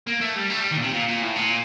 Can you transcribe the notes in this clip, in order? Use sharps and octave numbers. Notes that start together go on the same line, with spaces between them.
A#3
A3
G3
A3
G3
D#3
A#2
C3
A#2
A#2
A2
A#2